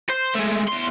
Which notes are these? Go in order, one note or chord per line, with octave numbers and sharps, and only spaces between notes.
C5
G#3 A3
E2 C6